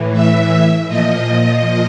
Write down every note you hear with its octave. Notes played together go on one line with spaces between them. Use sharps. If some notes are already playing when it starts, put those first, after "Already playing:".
Already playing: A2 E3
E5
A#2 F3 D#5